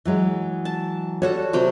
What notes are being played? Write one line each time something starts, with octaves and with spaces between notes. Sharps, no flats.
E3 F#3 G#3
A5
G3 F#4 A4 C#5
C3 F#3 G5